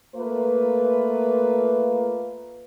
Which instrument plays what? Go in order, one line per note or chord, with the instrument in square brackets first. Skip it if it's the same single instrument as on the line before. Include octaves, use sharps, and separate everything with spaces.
[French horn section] A3 A#3 F4 B4